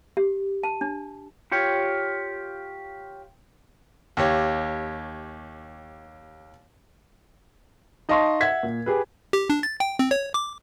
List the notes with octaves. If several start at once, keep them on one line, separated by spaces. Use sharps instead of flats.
G4
A5
D4
F4 G4 C#5
D#2 G4 C#5
D#4 D#5 F5 A5 C6 C#6
E5 F#5 G#6 B6
A#2
G4 G#4 B4
G4
D4
A6
G5
C4
C#5
D6